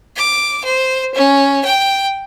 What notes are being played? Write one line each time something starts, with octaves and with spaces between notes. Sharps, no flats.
D6
C5
C#4
G5